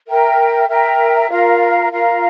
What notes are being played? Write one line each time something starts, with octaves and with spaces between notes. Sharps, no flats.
A#4 E5 G5 A#5
A#4 E5 G5 A#5
F4 A#4 F5 A#5
F4 A#4 F5 A#5